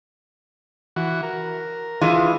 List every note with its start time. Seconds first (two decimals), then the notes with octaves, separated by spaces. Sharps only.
0.96 E3 F#4
1.23 A#4
2.01 E3 G#3 F4